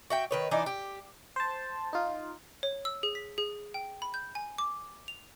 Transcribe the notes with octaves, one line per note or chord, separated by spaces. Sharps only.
F#4 E5 G5
D#3 B4 C#5
E3 D4 D#4
G4
C5 A5
D#4 F4
C#5
E6
G#4
B6
G#4
G5
B5
G6
G#5
D6
F7